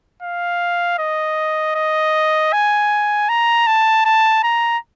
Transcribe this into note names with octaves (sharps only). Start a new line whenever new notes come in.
F5
D#5
D#5
G#5
A#5
A5
A5
A#5